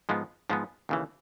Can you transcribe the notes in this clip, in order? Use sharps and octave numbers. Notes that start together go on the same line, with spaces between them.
G#2 F3 G#3 B3
G#2 F3 G#3 B3
D#2 C#3 E3